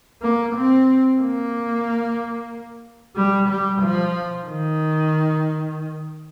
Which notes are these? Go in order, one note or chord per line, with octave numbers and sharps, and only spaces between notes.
A#3
C4
A#3
G3
G3
F3
D#3